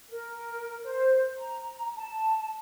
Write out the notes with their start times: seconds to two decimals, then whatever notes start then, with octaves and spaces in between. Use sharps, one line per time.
0.10 A#4
0.84 C5
1.38 A#5
1.96 A5